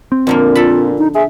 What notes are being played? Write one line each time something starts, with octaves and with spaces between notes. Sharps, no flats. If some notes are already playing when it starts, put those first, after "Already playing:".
C4
F2 A#2 D3 A#3
F4 A4 B5
D#4
G#4 E5